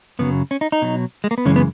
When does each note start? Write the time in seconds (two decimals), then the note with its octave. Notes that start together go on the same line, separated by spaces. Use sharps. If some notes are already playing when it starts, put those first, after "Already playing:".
0.19 F#2 C#3 F#3 B3
0.51 C#4
0.61 D#4
0.72 D#4
0.82 B2 F#3
1.24 G#3
1.31 A#3
1.38 B3
1.45 F#2 C#3 E3 G#3 C#4
1.56 B3